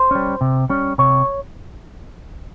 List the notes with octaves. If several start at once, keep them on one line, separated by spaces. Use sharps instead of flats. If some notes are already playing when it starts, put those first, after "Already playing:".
Already playing: C5
G3 C#4
C3
G3 C#4
C3 C#5